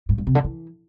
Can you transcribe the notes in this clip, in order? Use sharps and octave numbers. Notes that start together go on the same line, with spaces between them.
G#2
G2
C3
D3
E3